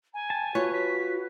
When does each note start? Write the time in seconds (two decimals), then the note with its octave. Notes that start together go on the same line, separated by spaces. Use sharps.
0.14 G#5 A#5
0.30 G5 A5
0.55 F4 F#4 B4 C#5
0.73 F#4 B6